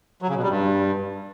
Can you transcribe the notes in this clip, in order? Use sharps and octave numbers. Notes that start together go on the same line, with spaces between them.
F#3
C#3
B2
G3
G2